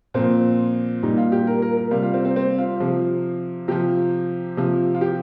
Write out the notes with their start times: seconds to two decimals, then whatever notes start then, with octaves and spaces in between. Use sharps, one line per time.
0.14 A#2 F3 C4
1.03 A#2 G3 D#4
1.18 F4
1.32 G4
1.47 A#4
1.62 A#4
1.77 A#4
1.91 C3 G3 F4
2.03 F4
2.14 C4
2.25 C4
2.36 C4
2.59 F4
2.80 C3 F3
3.68 C3 F3 G4
4.57 C3 F3
4.95 F4
5.01 G4